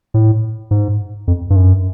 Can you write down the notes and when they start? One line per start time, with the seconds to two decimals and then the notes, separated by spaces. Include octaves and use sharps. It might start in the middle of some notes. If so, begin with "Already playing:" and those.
0.14 A2
0.71 G#2
1.28 F2
1.50 G2
1.56 F#2